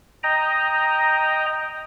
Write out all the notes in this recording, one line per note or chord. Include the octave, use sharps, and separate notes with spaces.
D#5 G5 A#5